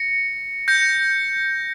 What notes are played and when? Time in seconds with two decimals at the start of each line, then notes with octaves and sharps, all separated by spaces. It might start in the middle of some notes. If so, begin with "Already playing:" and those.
Already playing: A#6 C#7
0.68 G6 A#6 C#7